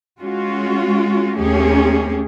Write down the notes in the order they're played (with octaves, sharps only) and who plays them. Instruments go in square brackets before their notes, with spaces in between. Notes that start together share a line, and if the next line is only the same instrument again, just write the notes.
[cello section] G#3 C#4 F4 F#4
D#2 A3 C#4 G4 G#4